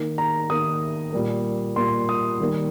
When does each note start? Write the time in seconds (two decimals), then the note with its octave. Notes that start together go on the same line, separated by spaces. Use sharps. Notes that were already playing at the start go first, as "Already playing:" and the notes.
Already playing: D#3 A#3
0.18 A#5
0.50 D#3 A#3 D#6
1.13 A#2 G3 A#3
1.76 A#2 G3 A#3 C6
2.09 D#6
2.40 D#3 G3 A#3